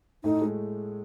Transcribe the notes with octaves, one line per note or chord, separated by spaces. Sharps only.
A2 A3 D#4
G#3